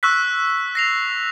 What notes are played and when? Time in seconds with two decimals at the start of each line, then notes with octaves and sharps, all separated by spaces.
0.03 C#6 E6 F#6 B6
0.75 A#6 C7 F7